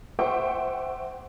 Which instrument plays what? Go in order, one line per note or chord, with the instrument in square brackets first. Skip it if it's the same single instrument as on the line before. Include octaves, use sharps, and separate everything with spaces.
[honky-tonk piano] C5 E5 F#5 G5 C#6 D6